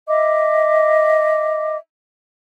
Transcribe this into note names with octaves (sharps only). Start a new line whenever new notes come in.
D#5 E5 D6